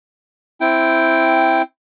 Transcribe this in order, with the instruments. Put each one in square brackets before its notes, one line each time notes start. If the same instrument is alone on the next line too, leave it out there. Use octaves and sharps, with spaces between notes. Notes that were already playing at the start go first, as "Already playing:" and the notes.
[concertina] C4 E4 G5